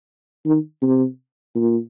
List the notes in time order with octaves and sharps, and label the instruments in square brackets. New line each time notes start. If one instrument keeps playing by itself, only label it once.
[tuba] D#3
C3
A#2